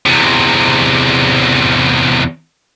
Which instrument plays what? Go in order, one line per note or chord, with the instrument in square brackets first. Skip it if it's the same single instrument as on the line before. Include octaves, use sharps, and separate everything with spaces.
[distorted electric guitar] E2 C3